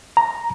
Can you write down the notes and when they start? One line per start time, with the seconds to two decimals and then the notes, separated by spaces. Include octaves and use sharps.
0.17 A#5